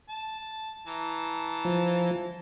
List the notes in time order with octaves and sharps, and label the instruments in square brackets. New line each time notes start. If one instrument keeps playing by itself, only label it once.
[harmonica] A5
E3 A5 A#5
[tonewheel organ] F3